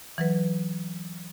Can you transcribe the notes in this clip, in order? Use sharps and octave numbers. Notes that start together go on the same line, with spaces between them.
E3 F#3 B4